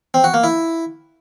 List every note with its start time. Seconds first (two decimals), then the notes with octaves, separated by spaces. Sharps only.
0.14 C4
0.24 F#4
0.34 A#3
0.44 E4